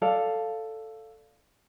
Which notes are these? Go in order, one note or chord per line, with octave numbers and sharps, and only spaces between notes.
A4 D5 F5